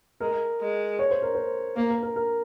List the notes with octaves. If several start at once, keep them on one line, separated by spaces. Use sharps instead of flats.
G#3 A#4
G#3
C#5
C5
A#4
C5
A#3 A#4
A#4
A#4
A#4